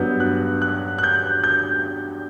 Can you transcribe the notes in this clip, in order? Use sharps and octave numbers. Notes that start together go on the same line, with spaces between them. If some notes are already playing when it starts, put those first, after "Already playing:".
Already playing: G2 F#3 B3 G6
F#6
F#6
F#6
G6
G6